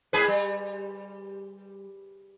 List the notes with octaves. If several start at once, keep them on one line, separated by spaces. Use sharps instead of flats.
G#2 G#4 B4
G3